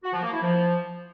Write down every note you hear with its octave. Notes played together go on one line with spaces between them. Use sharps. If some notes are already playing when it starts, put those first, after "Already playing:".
F#4
F3
A#3
E4
F3